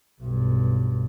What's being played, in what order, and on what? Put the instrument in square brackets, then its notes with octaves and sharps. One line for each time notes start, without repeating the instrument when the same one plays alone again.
[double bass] B1 G2